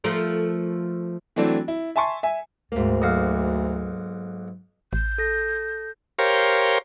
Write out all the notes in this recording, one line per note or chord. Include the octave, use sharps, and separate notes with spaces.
F3 A3 A#4
E3 F#3 A3 C4 D4
E4
E5 G#5 A5 C6 C#6
E5 G#5
D2 G#2 A#3
B1 F#4 F5
A1 G6
A4 A#6
G4 A#4 C5 C#5 F5